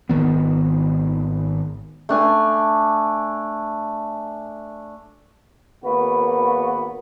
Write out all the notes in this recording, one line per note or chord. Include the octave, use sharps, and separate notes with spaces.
G#1 D#3 B3
A3 D4 G#5
G#1 A#3 B3 F#4 B4